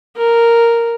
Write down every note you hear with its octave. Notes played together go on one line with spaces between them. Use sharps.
A#4